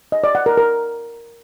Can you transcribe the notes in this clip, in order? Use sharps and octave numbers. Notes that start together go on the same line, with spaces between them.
D#5
D5
F#5
A#4
A#4